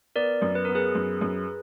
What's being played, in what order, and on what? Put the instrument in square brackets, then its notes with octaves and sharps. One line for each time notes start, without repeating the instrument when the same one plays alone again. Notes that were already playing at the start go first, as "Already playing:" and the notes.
[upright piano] B3 [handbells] A#4 D5
[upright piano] F#2
[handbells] B4
[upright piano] B3 [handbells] A#4
[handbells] G#4 B4
[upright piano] F#2
F#2